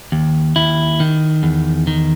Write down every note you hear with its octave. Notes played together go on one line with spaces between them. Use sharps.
D#2
D#2 E4
D#3
E2
D#3